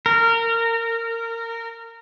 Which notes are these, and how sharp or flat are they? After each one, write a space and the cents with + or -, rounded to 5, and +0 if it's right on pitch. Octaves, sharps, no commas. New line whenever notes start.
A#4 -25